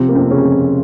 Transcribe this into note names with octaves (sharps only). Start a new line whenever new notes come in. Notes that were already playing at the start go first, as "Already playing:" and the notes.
Already playing: C3 F3 C4
A#3
F2 C3 C4
C#3 C#4
F2